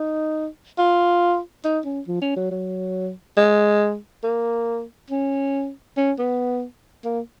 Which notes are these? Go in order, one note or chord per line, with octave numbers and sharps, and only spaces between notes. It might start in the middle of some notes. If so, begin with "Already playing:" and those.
Already playing: D#4
F4
D#4
C#4
F3
C#4
F#3
F#3
G#3
A#3
C#4
C#4
B3
A#3